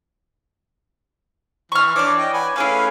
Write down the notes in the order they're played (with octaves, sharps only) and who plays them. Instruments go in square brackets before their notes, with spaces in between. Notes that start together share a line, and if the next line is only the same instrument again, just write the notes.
[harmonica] E3 [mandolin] C#6 F6
[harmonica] E3 D4 D6 [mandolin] C#5 D5
[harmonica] D#5 G5
B4 F#5 G#5
[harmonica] A3 C#4 F5 [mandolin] E4 G#4 B4